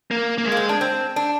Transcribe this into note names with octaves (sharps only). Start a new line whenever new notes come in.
A#3
A#3
G#3
A#3
C4
D4
C4
D4